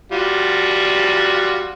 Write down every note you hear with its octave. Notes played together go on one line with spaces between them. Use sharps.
G3 F4 F#4